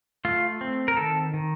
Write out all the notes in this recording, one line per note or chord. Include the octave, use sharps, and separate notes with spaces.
A3 F4
C4
A#4
D#3 A4
D#3